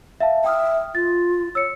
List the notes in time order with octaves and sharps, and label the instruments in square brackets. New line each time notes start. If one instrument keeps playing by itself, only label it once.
[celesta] E5 F5 A5
[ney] E5 [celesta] G5 D#6 F6
[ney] F4 [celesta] A6
[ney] C#5 [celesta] E6 C#7